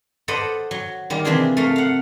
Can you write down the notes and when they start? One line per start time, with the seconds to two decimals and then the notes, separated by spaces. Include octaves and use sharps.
0.28 A4 B4 C5 D5 D#5 F#5
0.71 F#3
1.10 D#3 G3 A#3
1.25 C3 E3 F3 C4 D4 G#4
1.57 A3 A4 A#4 F5
1.76 F5 F#5